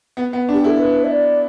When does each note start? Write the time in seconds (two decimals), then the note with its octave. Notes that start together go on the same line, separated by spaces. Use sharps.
0.17 B3
0.33 B3
0.49 D4
0.54 G4
0.64 E4 A4
0.79 B4
1.04 E5
1.11 D5